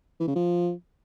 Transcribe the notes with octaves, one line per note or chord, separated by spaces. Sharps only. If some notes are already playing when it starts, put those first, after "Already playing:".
E3
C#3
F3